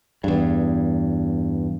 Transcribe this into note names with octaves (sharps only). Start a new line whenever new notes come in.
E2 G2